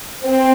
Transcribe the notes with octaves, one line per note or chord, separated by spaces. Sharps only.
C4